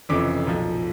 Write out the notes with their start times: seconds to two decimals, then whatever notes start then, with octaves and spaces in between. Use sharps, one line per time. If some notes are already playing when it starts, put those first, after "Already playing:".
0.09 F1 F2 C#3 E3 D6
0.47 B1 A#2 F3